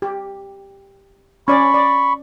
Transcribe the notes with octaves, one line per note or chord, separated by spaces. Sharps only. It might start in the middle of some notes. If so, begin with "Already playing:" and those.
G4
C#4 D5 B5 C#6
D5